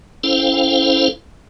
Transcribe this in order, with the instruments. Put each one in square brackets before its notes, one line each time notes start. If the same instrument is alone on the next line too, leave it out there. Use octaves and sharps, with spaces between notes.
[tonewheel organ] C#4 E4 A4 C5 F5 G5